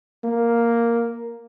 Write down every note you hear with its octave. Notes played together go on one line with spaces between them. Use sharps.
A#3